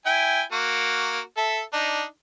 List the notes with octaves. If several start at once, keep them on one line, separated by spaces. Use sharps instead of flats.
E4 G5 G#5
A#3 F#4
A4 E5
D4 D#4